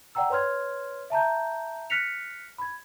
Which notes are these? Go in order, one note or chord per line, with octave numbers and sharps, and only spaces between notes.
D5 F#5 G5 A#5 E6
B4 C#5 C6 F6 G#6
E5 A5 A#5 G6
F6 F#6 A#6 B6 C#7 F7
B5 G#6